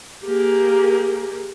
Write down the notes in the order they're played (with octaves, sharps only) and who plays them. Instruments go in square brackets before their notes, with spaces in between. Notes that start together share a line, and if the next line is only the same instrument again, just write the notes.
[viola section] A#3 G4 G#4 A#4